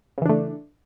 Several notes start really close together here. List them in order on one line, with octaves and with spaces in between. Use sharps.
C#3 E3 D4 A3